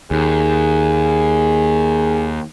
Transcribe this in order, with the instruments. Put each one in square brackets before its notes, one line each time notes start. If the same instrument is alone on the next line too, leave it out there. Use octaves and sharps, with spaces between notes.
[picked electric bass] D#2 [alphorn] G#4